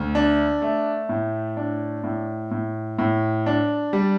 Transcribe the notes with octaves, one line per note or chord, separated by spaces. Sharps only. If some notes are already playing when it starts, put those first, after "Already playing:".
Already playing: D2
D4
A3
A2
D4
A2
A2
A2
D4
G3